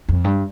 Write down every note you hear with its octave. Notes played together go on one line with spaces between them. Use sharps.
F2
G2